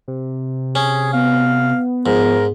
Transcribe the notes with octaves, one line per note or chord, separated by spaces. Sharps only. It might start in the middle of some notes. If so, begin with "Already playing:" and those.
C3
C#4 G#4
B3 F5
G#2 F3 A#4